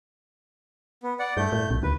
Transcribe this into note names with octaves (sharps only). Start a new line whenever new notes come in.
B3
D5 F#5
G2 A3 G6
A2
B1
D2 B4